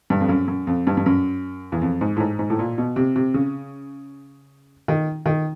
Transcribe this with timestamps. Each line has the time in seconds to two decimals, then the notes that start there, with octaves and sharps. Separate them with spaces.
0.10 G2
0.21 F2
0.29 F#2
0.48 F#2
0.67 F2
0.87 G2
0.97 G2
1.06 F#2
1.72 E2
1.82 F2
2.01 G#2
2.17 A2
2.20 G#2
2.39 G#2
2.50 A2
2.59 A#2
2.78 B2
2.96 C3
3.16 C3
3.34 C#3
4.88 D#3
5.26 D#3